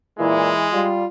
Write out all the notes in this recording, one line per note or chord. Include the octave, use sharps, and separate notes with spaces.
A#2 E3 G#3 E4
G3 F4